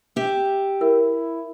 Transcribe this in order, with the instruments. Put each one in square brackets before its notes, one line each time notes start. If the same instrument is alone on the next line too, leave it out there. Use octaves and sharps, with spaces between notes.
[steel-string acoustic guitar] G4 E5
[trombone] E4 [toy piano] A#4